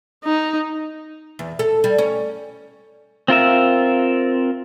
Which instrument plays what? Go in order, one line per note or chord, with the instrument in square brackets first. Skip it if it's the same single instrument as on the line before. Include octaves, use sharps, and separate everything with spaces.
[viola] D#4
[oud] E2
A4
G3
C#4
[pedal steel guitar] C4 F4 A#4 E5